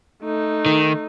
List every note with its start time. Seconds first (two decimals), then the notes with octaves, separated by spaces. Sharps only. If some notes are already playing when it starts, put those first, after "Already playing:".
0.23 A3 D#4
0.66 D#3